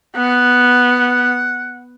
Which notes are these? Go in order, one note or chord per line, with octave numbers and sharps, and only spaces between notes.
B3 F#5